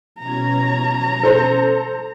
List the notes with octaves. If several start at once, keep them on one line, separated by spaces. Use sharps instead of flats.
B2 C#4 A#5 G#6
A4 C5